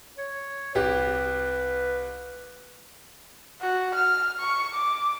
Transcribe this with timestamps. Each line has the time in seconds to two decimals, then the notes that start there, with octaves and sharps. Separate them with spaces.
0.18 C#5
0.75 C2 G4 B4
3.62 F#4
3.95 F6
4.40 C#6
4.74 D6